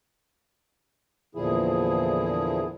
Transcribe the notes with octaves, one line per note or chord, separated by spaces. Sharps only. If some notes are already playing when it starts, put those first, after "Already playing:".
E2 A#2 D3 F3 E4 G#4